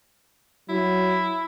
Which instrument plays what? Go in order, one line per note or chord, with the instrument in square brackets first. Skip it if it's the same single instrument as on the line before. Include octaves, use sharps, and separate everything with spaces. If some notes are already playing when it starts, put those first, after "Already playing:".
[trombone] F#3 [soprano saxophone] E4